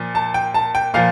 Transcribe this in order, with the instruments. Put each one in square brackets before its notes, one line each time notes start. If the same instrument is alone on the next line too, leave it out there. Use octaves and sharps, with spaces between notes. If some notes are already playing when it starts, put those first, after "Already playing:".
Already playing: [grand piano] A#2 F3
A5
G5
A5
G5
A#2 F3 F5